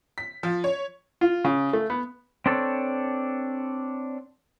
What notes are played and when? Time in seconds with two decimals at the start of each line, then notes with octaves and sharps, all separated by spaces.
0.18 B6
0.43 F3
0.64 C#5
1.21 F4
1.45 C#3
1.73 A3
1.90 B3
2.46 C4 D4 A4 C#5